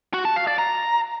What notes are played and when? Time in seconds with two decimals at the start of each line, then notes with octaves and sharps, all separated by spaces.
0.14 F#4
0.25 A5
0.36 F5
0.47 D5
0.59 A#5